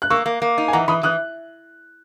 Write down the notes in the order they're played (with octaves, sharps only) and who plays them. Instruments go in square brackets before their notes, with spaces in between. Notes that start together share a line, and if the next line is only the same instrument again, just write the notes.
[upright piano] F#6
[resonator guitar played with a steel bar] A#3 [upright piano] C#6 E6
[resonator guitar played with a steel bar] A#3
A#3
D#4
[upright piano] G#5
[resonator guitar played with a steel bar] E3 [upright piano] F#5 A#5
[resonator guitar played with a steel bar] E3 [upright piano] B5 D#6
[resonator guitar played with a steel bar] E3 [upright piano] D#6 F#6